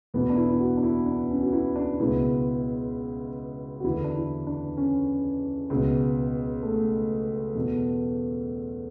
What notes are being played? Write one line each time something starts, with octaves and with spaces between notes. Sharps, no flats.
E2 B2 B3
D4
E4
E4
F#4
D4
E4
D4
C#4
F#4
E4
D4
C#2 B2 E4
F#4
E2 D3 E4
D4
E4
D4
C#4
C#2 B2
A3
E2 B2